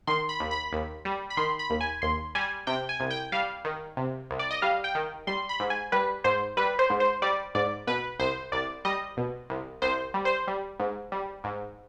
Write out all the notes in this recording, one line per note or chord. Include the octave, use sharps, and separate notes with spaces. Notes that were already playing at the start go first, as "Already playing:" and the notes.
D#3 C6
B5
D#2
B5
D#2
G3
B5
D#3 C6
B5
D#2
G#5
D#2 C6
G3 G#5
C3 G5
G#5
C2
G5
G3 F5
D#3
C3
C2
D5
D#5
G3 F5
G5
D#3
G3 C6
B5
G#2
G#5
G3 B4
G#2 C5
G3 B4
C5
G#2
C5
G3 D5
G#2 D5
B2 B4
C2 C5
C2 D5
G3 D#5
B2
C2
C2 C5
G3
C5
G3
G#2
G3
G#2